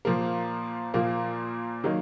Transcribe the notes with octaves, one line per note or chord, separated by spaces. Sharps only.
A#2 F3 A#3
A#2 F3 A#3
D#3 F#3 A#3 D#4